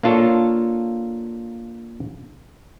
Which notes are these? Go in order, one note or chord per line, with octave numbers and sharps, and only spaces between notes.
A#3 D4 F4 A4 C#5